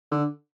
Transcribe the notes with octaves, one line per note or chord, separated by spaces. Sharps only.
D3